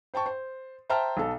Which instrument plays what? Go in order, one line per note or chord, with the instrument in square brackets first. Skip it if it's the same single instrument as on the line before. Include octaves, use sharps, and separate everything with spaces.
[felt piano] C5 G5 A5 C#6
C5
C5 E5 G5 A5 A#5 F6
B1 A4